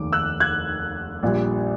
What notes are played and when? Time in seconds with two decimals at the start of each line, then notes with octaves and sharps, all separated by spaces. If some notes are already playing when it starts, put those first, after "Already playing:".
Already playing: F1 D#2 D#3 D6
0.13 E6 F#6
0.40 F#6 G#6
1.23 A#1 A#2 G3